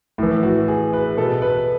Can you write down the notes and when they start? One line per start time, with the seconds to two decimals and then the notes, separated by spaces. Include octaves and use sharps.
0.18 A2 E3 E4
0.43 F#4
0.68 G#4
0.93 B4
1.17 B2 A4
1.42 B4